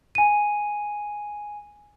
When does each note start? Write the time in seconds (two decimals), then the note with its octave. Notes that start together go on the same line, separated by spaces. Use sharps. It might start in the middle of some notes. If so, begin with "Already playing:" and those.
0.15 G#5 D#7